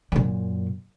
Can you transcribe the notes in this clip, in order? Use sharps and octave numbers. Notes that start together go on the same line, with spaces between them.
F#2 A#2